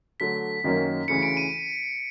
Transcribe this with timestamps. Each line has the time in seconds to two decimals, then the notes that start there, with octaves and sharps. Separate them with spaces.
0.20 D3 F#3 A3 B6
0.64 F#2 D#3 F#3 A#3 C#4
1.08 D2 C#3 E3 C#7
1.23 D7
1.37 D#7